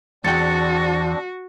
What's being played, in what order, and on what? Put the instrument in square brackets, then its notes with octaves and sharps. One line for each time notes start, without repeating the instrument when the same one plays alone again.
[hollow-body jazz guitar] E2 G5 [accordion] C4 D4 [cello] F#4 [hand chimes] A6 C#7